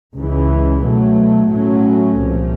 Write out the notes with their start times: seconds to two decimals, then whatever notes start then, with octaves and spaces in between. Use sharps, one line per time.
0.14 C#2 C#3 E3
0.83 B2 F#3 A3
1.50 A2 F#3 A3 C#4
2.18 C2 A#2 F3